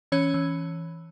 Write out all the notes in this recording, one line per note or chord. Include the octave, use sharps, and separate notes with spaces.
E3 C#4 C#5
E3